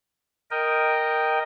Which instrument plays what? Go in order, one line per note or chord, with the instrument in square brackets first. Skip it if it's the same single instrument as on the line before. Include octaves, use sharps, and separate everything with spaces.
[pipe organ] A#4 D#5 G5